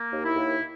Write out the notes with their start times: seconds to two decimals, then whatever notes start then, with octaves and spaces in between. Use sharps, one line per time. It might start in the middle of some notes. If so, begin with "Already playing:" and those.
Already playing: A#3
0.12 D#2
0.24 E4
0.36 D#2